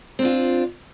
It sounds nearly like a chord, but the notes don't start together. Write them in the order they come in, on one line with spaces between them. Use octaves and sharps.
C4 D4 F4